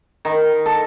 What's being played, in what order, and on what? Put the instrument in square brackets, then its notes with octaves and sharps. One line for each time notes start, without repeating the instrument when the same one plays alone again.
[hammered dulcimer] D#3
A4